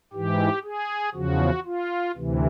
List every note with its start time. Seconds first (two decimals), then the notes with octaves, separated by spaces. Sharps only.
0.13 G#2 E3 G4
0.64 G#4
1.14 E2 C#3 F3 F#4
1.66 F4
2.16 D2 C3 E3